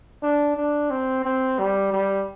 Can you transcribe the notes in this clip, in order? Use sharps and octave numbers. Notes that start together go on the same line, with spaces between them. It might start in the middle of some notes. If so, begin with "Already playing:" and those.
D4
D4
C4
C4
G3
G3